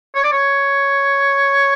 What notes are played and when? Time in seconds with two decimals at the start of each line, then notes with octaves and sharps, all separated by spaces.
0.15 C#5
0.24 D5
0.32 C#5